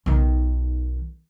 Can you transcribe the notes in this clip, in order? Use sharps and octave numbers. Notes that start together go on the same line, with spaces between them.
B1 D#3